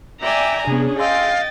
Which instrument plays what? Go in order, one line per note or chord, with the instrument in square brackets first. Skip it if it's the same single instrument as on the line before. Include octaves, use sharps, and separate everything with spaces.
[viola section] D5 G5 G#5 [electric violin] E5 A#5
[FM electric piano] C3 B3 [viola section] C#4 G#4 [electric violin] D4
[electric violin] D#5 A6 [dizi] F5 [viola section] G5 [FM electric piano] G#5 C6 E6